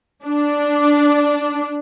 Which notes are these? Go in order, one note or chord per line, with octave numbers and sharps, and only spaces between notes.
D4